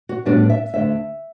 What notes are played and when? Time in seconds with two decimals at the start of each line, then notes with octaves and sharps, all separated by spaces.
0.09 F#4
0.25 A2 G3 B3 D4 F#4
0.50 E5
0.74 D2 D3 A3 E5